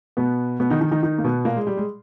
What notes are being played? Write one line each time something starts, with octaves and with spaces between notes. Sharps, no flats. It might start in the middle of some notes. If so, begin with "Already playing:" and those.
B2 B3
B2 B3
D#3 D#4
D#3 D#4
D#3 D#4
D#3 D#4
A#3
B2 B3
A#2 A#3
G#3
G3
G#3